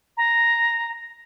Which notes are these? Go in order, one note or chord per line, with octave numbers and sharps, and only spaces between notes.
A#5